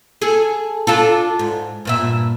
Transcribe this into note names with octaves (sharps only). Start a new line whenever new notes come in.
G#4 A4
D4 F4 A4
G#2
G2 A#2 E5